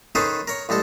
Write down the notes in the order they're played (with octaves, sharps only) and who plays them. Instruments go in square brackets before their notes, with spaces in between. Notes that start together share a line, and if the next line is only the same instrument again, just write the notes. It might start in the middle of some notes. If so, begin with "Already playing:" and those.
[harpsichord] D#3 C#4 G#4 A4 B4 C5
A#4 C#5
A1 G3 G#3 A4 A5